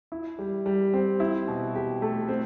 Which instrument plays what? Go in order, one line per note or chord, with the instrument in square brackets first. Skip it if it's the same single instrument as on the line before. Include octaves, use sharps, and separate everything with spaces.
[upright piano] E4
G3
G3
C4
E4
B2
G4
A3
C4